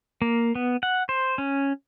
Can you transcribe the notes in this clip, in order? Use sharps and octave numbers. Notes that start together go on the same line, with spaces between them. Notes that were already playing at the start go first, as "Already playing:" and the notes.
A#3
B3
F#5
C5
C#4